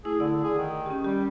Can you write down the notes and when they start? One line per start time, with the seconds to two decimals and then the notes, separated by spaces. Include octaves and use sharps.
0.05 A3 E4 G#4
0.20 D3 E4 D5
0.44 G#4
0.58 D#3
0.86 C#4 G4
1.04 G3 G4